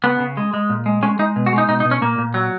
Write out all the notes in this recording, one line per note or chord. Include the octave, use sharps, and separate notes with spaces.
C#3 B3
C#3
G#3
G#3
A#2
G#3
G#3 C#4
G#3 D#4
B2
F#4
G#3
D#4
B2 D#4
D#4
B2
C#4
A#2 A#3
A#2
F#3